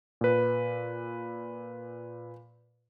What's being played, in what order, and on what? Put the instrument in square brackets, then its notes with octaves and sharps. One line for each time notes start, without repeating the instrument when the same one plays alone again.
[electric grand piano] A#2 B4